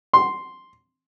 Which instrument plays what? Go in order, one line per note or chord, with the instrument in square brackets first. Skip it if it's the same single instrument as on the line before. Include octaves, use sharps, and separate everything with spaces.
[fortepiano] C6